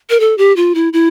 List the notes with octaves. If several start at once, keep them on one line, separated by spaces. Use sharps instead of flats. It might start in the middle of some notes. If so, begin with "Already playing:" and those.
A#4
A4
G4
F4
E4
E4